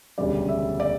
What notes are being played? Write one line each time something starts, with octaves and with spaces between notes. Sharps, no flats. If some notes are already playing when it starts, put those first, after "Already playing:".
E1 D2 C#3 G3 D5
E5
D5